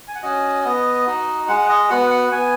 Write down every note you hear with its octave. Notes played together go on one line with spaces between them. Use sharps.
G#5
F#5
C#4 F#4 D#5
B3 D#5
D#4 F#4
G#3 F#5
D#5
B3 F#4 F#5
F#5
B3 G#5